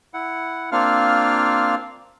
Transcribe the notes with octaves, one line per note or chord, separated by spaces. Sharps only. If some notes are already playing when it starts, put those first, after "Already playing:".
E4 F#5
A#3 C4 D4 F4 F5 F6